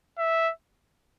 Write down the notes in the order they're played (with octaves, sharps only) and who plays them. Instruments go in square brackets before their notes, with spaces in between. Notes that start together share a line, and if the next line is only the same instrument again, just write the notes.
[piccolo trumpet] E5